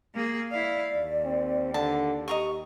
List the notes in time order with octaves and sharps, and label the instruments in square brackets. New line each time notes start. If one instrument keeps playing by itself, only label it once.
[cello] A#3 G#4
[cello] E4 F5 [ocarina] D5
[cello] D#2
[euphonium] C4
[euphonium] D3 [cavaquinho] A5
[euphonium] G4 [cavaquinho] D#5 A#5 C#6